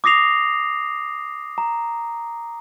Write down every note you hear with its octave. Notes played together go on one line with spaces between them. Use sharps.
D6 D#6 A#6 C7 F7
A#5